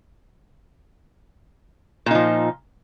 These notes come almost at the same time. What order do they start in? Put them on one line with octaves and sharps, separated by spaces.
A#2 D#4 F3